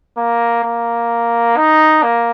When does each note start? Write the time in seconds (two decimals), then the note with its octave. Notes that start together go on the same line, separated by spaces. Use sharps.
0.17 A#3
0.64 A#3
1.57 D#4
2.03 A#3